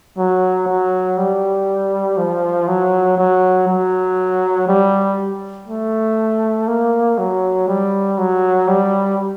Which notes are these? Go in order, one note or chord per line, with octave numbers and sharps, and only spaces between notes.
F#3
F#3
G3
F3
F#3
F#3
F#3
G3
A3
A#3
F#3
G3
F#3
G3